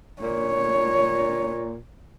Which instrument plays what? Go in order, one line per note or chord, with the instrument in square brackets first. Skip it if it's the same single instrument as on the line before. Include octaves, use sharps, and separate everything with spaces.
[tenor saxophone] A#2 [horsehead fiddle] C#5